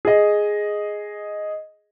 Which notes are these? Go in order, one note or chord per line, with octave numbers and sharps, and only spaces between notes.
G#4 D#5